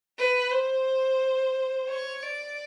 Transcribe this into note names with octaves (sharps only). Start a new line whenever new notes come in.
B4
C5
C#5
D5